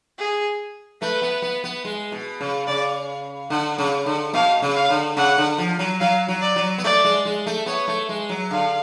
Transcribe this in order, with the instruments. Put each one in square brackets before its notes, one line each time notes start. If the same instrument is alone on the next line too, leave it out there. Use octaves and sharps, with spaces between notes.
[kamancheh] G#4
[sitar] A3 [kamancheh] B4
[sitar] B3
B3
B3
G#3
B2
C#3
[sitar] C#3 [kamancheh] D5
[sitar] D3 [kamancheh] F#5
[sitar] C#3
D3
[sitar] B2 [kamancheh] F5
[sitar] C#3
[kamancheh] F5
[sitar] D3
[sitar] C#3 [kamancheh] F#5
[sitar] D3
F3
F#3
[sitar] F#3 [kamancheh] F5
[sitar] F#3
[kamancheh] D5
[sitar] F#3
B3
[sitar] A3 [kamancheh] D5
[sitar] G#3
G#3
A3
[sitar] B3 [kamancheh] C#5
[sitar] A3
G#3
F#3
[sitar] D3 [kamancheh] F5